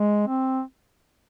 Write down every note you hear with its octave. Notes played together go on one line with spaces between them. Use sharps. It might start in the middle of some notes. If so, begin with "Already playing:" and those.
Already playing: G#3
C4